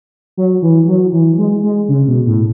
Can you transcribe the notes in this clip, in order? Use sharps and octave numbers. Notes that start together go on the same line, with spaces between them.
F#3
E3
F#3
E3
G#3
G#3
C#3
B2
A2